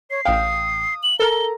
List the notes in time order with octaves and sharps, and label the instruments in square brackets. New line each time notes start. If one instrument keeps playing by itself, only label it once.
[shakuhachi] C#5 [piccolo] C7
[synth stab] A1 G5 [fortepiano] F5 [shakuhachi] D#6
[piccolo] F#7
[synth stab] A4 A#4 [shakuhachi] A#5 [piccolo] G7